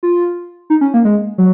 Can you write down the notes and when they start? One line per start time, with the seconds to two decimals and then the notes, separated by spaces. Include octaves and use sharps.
0.03 F4
0.70 D#4
0.81 C#4
0.94 A#3
1.05 G#3
1.38 F#3